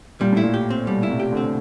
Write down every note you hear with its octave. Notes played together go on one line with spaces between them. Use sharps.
A#2 G3
A2 E4
A#2
G4
C4
B2 G3
E4
C3
G4
D3
C4